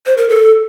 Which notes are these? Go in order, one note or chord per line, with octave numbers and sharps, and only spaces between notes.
C5
A#4
A4